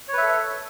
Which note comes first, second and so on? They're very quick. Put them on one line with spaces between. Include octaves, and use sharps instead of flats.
C#5 B4 E5 A4